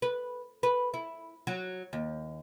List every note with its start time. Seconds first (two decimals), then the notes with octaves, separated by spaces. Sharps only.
0.02 B4
0.63 B4
0.94 E4
1.47 F#3
1.93 D#2